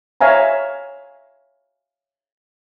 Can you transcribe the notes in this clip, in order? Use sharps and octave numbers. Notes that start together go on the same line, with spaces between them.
C#5 E5 F5 G#5 A#5